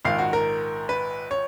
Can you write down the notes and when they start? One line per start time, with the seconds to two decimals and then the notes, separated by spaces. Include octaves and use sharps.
0.05 A#1 G#2 D#3 F5
0.18 F#4
0.33 A#4
0.89 B4
1.31 C#5